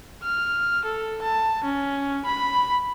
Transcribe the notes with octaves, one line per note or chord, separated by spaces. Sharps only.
F6
A4
A5
C#4
B5